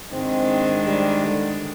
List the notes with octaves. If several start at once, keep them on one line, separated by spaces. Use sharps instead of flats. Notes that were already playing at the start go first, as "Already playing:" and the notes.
G#2 D#3 G#3 C4 D4
G3
D3